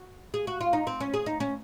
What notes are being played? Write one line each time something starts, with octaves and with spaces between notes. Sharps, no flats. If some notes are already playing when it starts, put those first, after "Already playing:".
Already playing: F#4
G#4
F#4
F4
D#4
C4
C#4
G#4
D#4
C#4